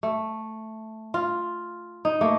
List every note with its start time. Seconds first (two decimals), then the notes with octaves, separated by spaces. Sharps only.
0.03 A3
1.14 F4
2.05 D#4
2.21 A3 A#3